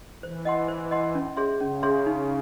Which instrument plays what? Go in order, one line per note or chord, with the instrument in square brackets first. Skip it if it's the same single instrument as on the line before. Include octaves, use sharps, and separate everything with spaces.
[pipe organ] E3 [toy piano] C5
[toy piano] D#5 F#5 C6
C5
D#5 F#5 C6
C#4
G#4 C#5 E5 C6
[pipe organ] C#3 [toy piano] C#4
[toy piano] G#4 C#5 E5 C6
D#4